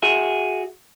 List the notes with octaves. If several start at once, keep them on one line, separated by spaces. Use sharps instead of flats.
F#4 G#4 E5